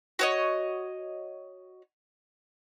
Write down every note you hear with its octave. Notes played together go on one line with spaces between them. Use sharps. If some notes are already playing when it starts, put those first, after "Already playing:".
F#4 C#5 D#5